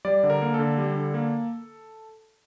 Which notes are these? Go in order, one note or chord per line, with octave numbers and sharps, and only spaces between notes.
G3 D5
D3
A#4
A#3
A4
D3
G3
D3
A#3